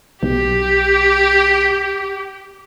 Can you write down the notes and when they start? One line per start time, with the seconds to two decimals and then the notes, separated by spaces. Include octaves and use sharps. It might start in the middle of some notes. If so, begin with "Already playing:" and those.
0.23 B1 G4